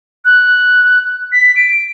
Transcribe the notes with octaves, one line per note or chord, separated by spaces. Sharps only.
F#6
B6
D7